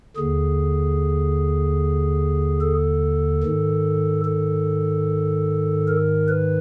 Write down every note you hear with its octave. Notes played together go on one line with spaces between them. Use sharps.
D#2 D3 G#4
A4
G#2 D#3
A4
A#4
B4